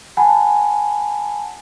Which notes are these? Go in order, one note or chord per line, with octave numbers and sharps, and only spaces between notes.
F#5 G#5 A5 B5